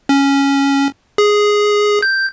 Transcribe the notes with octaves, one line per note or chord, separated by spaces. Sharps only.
C#4
G#4
G6